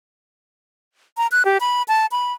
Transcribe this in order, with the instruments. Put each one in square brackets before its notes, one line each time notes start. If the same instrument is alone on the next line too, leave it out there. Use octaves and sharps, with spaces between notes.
[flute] A#5
F#6
G4
B5
A5
B5